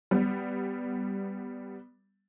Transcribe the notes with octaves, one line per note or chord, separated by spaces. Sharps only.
G3 B3